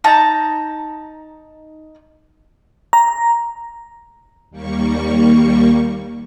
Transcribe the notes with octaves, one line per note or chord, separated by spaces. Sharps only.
D#4 A5 A#5
A#5
D#2 G3 A#3 C#6